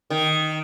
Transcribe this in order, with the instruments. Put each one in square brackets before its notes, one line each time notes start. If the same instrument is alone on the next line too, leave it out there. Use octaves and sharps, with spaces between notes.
[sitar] D#3